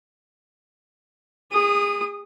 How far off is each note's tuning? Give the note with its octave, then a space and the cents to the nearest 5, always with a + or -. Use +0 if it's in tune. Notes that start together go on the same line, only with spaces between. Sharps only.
G#4 -35 D#6 -10